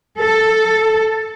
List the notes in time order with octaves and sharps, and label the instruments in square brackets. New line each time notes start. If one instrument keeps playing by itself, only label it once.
[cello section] A4